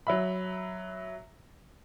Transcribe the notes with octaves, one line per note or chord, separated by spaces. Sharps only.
F#3 E5 B5